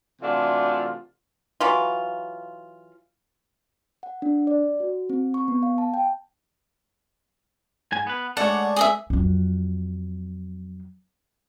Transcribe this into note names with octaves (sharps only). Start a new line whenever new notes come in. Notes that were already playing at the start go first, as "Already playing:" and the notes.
C3 E3 A3 D4 F4 F#4
E3 F#3 F4
F#5
D4
D5
F#4
C4
C#6
B3
F5
A5
G5
G#2 G#5
B3 B4
G#3 A3 D4 A4 C#5 F#5
G#4 D#5 E5
F2 F#3